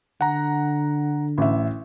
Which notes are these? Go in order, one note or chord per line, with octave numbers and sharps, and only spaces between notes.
D3 F#5 A#5
A1 E5